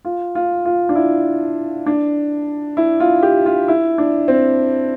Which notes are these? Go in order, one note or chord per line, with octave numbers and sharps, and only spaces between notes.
F4
F4
F4
D4
E4
D4
E4
F4
G4
F4
E4
D4
C4